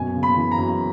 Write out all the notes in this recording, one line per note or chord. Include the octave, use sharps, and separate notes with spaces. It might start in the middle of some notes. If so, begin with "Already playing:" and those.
Already playing: F#2 B2 G#5
C#3
B5
E3
A#5
F#2